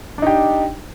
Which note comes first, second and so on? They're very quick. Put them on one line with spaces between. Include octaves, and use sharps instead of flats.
D4 D#4 G4